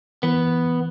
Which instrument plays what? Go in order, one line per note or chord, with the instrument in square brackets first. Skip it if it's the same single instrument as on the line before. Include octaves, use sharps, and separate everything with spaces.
[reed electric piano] E3 [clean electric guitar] B3